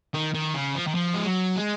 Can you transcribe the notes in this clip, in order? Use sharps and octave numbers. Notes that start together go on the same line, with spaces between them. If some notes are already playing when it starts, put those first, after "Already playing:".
D#3
D#3
C#3
F3
D#3
F3
G#3
F#3
G#3